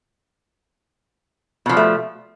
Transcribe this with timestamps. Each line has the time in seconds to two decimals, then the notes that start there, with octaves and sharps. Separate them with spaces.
1.66 B2
1.69 F3
1.73 G3
1.77 A3